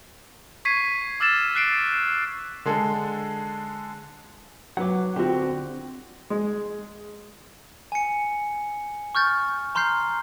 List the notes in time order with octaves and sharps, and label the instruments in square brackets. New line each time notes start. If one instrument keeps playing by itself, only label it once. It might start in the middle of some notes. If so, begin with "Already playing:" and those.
[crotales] C#6 G#6 B6 C7 D#7
D6 E6 F6 A6 E7
F#6 C7 D7
[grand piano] D3 G#3 A4
[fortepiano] F#3 B4 [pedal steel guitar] F#5 D6
[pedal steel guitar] D3 C4 [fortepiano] F#4 G4
[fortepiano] G#3
[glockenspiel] G#5 C#7
C#6 F6 G6 A6
A#5 C6 F6 G6 C7